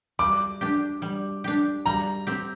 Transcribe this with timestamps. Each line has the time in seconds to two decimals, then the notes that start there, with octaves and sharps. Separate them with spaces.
0.19 G3 D6
0.61 D4 G4
1.02 G3
1.44 D4 G4
1.86 G3 A#5
2.27 C4 G4